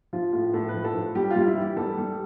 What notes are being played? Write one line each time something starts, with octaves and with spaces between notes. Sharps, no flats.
F3 F4
A2 F4
A2 A4
B4
F3
A4
F3
G3 G4
F4
G3
E4
E3
G4
G3 A4
G3